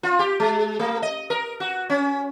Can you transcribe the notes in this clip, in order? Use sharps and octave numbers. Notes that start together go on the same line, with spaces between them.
F4
G4
G#3
A3
D#5
A#4
F#4
C#4